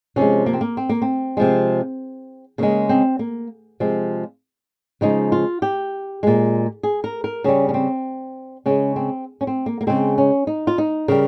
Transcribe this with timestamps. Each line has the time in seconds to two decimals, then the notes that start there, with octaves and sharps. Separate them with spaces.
0.16 C3 F3 G#3 C#4
0.46 A#3
0.53 C4
0.61 A#3
0.77 C4
0.89 A#3
1.02 C4
1.37 C3 F3 G#3
2.58 C#3 G#3 A#3
2.89 C4
3.19 A#3
3.80 C3 F3 G#3
5.01 C#3 F3 G#3 D#4
5.32 F4
5.62 G4
6.23 A#2 G#3
6.83 G#4
7.04 A#4
7.24 A#4
7.44 C#3 G3 C#4
7.69 C#4
7.74 C4
8.66 C#3 G#3 C#4
8.96 C4
9.41 C#4
9.47 C4
9.66 A#3
9.81 A#3
9.87 C#3 G#3 C4
10.18 C#4
10.47 D#4
10.67 F4
10.78 D#4
11.08 C#3 G3 A#4